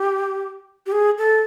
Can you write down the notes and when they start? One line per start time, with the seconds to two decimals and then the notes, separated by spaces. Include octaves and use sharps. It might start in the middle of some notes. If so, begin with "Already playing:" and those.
Already playing: G4
0.86 G4
0.92 G#4
1.18 A4